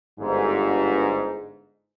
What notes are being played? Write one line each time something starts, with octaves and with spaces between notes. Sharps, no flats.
G1 G#2